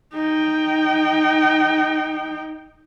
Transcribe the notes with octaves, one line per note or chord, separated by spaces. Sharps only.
D#4 G5